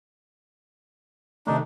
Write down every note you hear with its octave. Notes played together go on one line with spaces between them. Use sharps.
C3 D#3 A3 D4 D#4